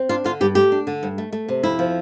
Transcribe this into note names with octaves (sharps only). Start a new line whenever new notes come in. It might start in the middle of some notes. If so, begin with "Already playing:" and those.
Already playing: C4
D4 F4
D3 F4
G2 G4
A3 G4
D4
D3
G2
A3
A3
C3
F2 E4
F3